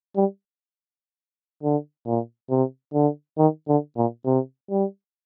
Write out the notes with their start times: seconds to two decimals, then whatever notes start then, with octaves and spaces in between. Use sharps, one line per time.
0.16 G3
1.63 D3
2.06 A#2
2.50 C3
2.94 D3
3.38 D#3
3.68 D3
3.97 A#2
4.26 C3
4.71 G3